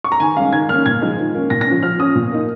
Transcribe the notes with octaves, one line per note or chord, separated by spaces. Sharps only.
C#6
A#5
D#3 G#5
G#3 C#4 F5
D#3 G#6
A#3 C#4 F6
A#2 G#6
F3 G#3 D#4
D#3
A#3 C#4
A#2 A#6
A#6
F3 C#4
F3 F6
C#4 D#6
A#2
A#3 D#4